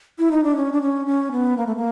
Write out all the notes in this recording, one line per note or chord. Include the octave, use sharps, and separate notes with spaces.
E4
D#4
D4
C#4
D4
C#4
C#4
B3
A#3
A3
A#3